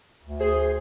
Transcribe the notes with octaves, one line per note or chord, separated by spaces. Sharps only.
D2
G#4 C5